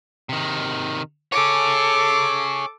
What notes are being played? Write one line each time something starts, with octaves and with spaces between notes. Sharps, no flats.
C3 D#3
G#4 A4 C#5 D6